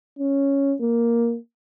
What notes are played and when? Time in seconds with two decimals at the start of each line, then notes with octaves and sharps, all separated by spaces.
0.19 C#4
0.81 A#3